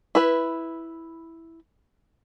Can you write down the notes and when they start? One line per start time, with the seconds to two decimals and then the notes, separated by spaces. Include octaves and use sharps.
0.15 E4 B4